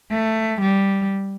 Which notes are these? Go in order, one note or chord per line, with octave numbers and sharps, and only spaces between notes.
A3
G3